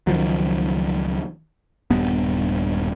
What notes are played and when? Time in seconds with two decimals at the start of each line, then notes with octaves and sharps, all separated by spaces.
0.07 C#2 D#3 F3 F#3
1.90 D#1 G2 B3